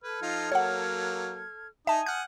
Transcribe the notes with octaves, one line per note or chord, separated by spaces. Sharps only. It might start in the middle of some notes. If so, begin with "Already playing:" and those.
A4 B4 F6 G#6
F3 D#4 F4
F#3 A#3 C#5 F#5
D#4 E5 G#5 A5 D#6
F#5 F6 G6